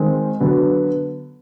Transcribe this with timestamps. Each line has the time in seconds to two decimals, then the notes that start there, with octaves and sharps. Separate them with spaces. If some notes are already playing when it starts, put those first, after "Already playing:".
Already playing: D#3 G#3 C4
0.40 D3 F#3 B3